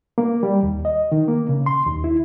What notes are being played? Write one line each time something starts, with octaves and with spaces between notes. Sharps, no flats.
A#3
G3
D#2
D#5
D#3
A#3
C#3
C6
D#2
E4